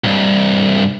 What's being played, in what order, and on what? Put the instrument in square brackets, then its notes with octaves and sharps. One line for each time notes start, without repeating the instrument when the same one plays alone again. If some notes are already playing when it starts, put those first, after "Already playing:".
[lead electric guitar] C2 G2